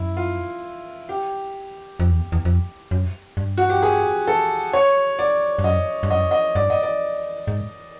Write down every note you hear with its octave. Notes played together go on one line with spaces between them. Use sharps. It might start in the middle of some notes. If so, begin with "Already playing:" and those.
Already playing: F#2 E4
F4
G4
F2
E2
E2
F2
F#2
G2
F#4
G4
G#4
A4
C#5
D5
G2
F#2 D#5
G2
F#2 D#5
D#5
G2 D5
D#5
D5
G#2